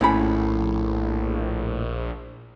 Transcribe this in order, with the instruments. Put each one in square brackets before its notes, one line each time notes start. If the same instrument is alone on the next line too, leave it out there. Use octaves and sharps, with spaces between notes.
[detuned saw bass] A#1 [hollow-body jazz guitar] A2 C#4 B5